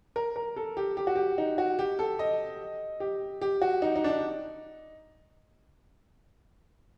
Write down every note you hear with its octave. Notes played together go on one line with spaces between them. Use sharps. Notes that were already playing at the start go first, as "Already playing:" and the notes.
A#4
A#4
A4
G4
G4
F#4
G4
D#4
F#4
G4
A4
D#5
G4
G4
F#4
D#4
D#4
D4
D#4